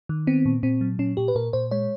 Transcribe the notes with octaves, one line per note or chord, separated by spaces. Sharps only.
D#3
B3 C4
A#2
A#2 C4
F#3
A#2 C#4
A#2 G4
B4
A#2 A#4
A#2 C5
G#3 C#5